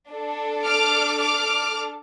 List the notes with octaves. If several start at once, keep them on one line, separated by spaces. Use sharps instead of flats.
D4 A4
D6 F6
D6 F6